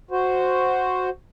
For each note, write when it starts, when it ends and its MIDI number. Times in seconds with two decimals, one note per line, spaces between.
0.11 1.09 66
0.11 1.09 72